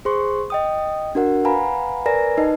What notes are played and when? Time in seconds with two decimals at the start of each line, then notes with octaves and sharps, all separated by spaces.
0.05 G#4 C5 C6 C#6
0.50 D#5 G5 D#6
1.15 D4 F#4 A#4 F#5
1.45 B4 F5 F#5 G#5 A#5 B5
2.06 A#4 B4 D5 G#5 A#5 A#6
2.38 D#4 B4 D#5 A5